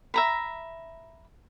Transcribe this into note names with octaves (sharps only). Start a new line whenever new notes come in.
E5 A#5 B5